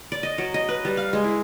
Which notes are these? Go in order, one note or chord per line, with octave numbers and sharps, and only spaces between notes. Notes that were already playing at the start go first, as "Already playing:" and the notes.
D5
D#5
F#3
D#5
B4
G3
F5
G#3
E4